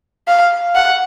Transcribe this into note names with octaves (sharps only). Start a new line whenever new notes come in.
F5
F#5